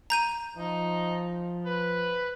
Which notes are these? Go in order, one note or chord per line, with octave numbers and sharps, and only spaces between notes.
A#5 G6 D#7
F3 D#4
B4